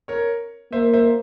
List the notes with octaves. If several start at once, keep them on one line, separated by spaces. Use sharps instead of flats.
A#4 C#5
A#3 C5 E5
C5 E5